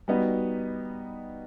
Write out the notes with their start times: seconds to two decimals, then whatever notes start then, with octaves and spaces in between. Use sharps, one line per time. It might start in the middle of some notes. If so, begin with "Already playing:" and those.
0.08 G3 B3 D#4 F#4